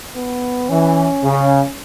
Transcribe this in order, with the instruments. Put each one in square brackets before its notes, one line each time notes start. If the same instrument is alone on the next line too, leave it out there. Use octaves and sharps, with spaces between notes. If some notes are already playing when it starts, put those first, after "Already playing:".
[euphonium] B3
[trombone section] E3 [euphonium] C#4
[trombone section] C#3